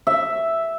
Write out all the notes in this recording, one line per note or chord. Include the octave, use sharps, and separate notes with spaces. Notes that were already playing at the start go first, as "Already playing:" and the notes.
E5